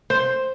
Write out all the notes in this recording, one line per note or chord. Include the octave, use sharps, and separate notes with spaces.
C5